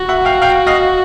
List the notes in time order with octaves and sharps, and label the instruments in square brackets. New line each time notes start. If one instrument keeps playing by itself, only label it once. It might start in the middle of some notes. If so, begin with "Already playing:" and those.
Already playing: [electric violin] F#4
[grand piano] E5 F#5
F5 G5
F5 G5
D#5 F5